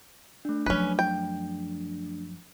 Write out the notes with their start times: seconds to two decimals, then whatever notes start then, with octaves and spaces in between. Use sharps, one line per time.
0.45 A3 D4
0.66 F#2 F3 C#4 B4
0.99 G5